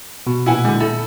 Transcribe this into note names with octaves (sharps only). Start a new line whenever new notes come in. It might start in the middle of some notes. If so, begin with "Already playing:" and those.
B2
A#2 E3 E4 F#5 G#5
D3 G#3
E4 A4